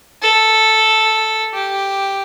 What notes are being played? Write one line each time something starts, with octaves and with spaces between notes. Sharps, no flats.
A4
G4